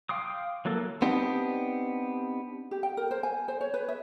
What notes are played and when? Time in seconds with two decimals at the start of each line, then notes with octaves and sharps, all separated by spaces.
0.09 F5 G5 C6 D6 D#6
0.65 E3 F#3 A#3 A4
1.02 B3 C4 D4 D#4 G4
2.71 G4
2.83 G5
2.97 A#4
3.11 C5
3.23 G#5
3.48 C5
3.61 C#5
3.74 B4
3.89 E5